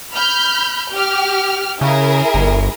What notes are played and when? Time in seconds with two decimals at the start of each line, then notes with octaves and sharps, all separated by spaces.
0.13 B5 F6 G6
0.92 G4 F6
1.81 C#3 E4 G#4 A#4
2.34 G1